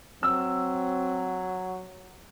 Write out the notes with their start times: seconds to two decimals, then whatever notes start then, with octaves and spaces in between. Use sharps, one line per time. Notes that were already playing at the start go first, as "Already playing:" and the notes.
0.23 F#3 C4 E6